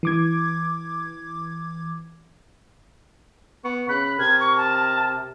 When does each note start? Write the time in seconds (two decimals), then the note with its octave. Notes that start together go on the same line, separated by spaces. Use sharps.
0.03 E3 D6 G#6
3.64 B3 C#6
3.89 C#3 B5 F#6
4.18 C3 A#4 G#6
4.40 C#6
4.57 A5